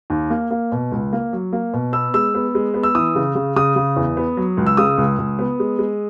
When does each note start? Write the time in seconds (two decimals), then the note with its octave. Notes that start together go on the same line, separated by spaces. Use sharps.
0.10 D#2
0.30 A#3
0.51 A#3
0.72 B2
0.92 C#2
1.13 A#3
1.33 F#3
1.53 A#3
1.74 B2
1.93 B3 E6
2.14 G#3 E6
2.35 B3
2.55 G#3
2.74 B3
2.83 E6
2.95 E3 D#6
3.15 C#3
3.35 C#3
3.56 C#3 D#6
3.76 C#3
3.96 E2
4.17 B3
4.37 F#3
4.57 C#2
4.66 E6
4.77 C#3 D#6
4.98 C#2
5.18 C#2
5.39 B3
5.60 G#3
5.79 G#3